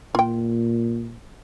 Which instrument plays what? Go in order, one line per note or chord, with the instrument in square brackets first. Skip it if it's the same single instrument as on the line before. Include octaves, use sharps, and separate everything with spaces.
[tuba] A#2 [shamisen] F4 G5